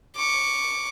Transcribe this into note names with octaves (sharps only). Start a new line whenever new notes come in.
C#6 D6